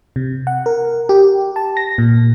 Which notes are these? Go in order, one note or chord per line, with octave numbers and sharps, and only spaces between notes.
C3
F#5
A#4
G4
A5
A#6
A#2